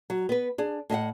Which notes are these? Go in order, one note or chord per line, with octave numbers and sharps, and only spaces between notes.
F#3
B3 B4
D4 G#4
A2 D#5 E5 F#5